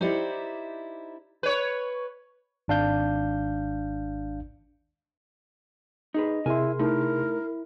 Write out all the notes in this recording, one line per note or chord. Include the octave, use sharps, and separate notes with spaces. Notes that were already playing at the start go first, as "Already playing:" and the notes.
D#4 E4 G4 C5 D5
B4 C#5
G#1 D4 F5 G6
D#4 G#4 B4 D#5
C3 E4 G#4 A#4 G#5 C6
A3 D#4 E4 A#4